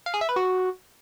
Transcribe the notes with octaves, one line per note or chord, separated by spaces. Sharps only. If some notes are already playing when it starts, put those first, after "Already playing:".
F5
G#4
E5
B4
F#4